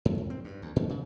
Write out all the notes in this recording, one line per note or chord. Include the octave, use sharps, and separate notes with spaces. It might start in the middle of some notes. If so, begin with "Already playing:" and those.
G2
F2
C4
G2
D2
A2
C#3